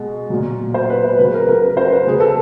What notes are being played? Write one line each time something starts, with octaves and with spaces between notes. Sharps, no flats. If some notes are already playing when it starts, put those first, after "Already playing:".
Already playing: B2 G#3
A#2 F#3
C5
B4
C5
C#3 F#3 B4
A#4
A#4
B4
C5
B4
C#3 F#3 G#4
A4